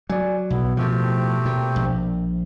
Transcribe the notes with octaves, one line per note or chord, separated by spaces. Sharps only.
F#3 D5 G#5
B1 B2 B3 E4
A2 F3 A3 C4 G4
A#2
A#1